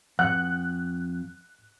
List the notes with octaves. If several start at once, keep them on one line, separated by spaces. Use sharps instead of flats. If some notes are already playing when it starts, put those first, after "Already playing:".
F2 F#5 F#6